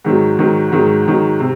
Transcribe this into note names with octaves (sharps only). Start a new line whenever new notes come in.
G#2 D#3 F#3
G#2 D#3 F#3
G#2 D#3 F#3
G#2 D#3 F#3
C3